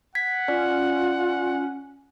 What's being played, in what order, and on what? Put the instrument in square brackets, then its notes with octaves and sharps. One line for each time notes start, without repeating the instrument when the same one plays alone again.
[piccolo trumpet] F#5 [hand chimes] G#6 B6
[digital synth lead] C#4 [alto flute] F4 [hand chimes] D5